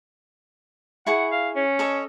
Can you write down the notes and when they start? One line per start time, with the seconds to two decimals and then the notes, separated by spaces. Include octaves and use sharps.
1.06 E4 G#4 F#5 C#6
1.31 F5
1.56 C#4
1.79 A4 C#5 D#5